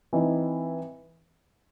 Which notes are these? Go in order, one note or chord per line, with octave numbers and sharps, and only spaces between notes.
E3 C4 D#4